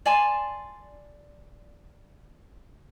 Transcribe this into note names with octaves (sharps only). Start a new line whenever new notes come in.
D5 G#5 A5 C6